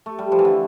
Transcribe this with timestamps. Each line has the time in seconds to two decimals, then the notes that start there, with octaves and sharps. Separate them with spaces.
0.06 A3
0.19 G3
0.32 F3
0.39 E3
0.45 D3